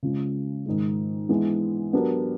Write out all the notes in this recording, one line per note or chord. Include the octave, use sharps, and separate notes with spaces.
C#3 F3 G#3
G#2 D#3 G#3
E3 G#3 B3 D4
F#3 B3 D4 G4 A#4